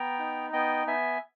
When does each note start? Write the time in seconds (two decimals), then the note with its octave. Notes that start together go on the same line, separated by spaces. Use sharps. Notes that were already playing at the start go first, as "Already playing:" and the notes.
Already playing: B3 G5 A#5
0.19 D#4
0.53 B3 D#5 G5
0.87 B3 E5 G#5